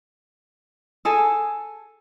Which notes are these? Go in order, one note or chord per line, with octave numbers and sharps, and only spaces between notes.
G#4 A4 G#5